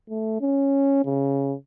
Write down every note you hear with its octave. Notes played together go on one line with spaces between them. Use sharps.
A3
C#4
C#3